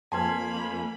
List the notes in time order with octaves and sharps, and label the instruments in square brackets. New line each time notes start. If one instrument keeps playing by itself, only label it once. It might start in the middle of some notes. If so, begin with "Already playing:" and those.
[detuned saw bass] F2 [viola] A#3 B5 [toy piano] B4 A5 [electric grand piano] G#5 C6 G#6